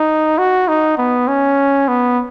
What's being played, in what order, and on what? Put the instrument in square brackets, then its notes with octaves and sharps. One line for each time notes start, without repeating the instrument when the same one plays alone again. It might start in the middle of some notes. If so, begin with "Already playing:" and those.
Already playing: [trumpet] D#4
F#4
D#4
B3
C#4
B3